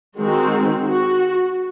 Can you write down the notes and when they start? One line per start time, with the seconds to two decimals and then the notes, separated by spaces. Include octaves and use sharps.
0.20 D#3 G#3 C4 F#4
0.87 F#4